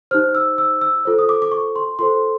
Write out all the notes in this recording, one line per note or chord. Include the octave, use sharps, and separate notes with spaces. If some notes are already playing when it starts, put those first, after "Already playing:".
D#4 G4 C5 F6
E6
E6
E6
F4 A4 C5
D#6
D6
D6
C#6
C6
F4 A4 C5 C6